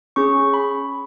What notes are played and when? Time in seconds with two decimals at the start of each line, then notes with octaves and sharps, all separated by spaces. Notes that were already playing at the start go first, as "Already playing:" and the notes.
0.16 C#4 G#4 C#6
0.54 B5